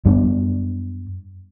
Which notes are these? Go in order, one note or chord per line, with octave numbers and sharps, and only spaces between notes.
F#2 G3 B3 D4